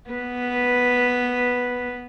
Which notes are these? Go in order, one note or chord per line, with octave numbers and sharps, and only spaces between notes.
B3 B4